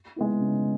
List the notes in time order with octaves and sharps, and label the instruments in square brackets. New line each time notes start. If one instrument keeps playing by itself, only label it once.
[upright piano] G#3 B3 E4
C#3